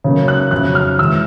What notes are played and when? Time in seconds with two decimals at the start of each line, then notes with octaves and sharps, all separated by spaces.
0.04 C#3 F#3 A#3
0.28 F#6
0.51 F2 C#3 F#3 F#6
0.75 F6
0.99 C#3 E3 G#3 E6